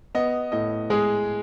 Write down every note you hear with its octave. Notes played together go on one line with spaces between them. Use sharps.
B3 D#5
A2 D#5
G#3 G#4